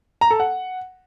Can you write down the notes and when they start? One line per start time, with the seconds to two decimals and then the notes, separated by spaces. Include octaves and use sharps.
0.21 A#5
0.31 A4
0.40 F#5